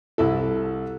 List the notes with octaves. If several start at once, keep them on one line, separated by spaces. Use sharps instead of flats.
C2 E4 A4